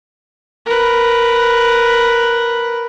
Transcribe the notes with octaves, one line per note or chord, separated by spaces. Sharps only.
A#4 B4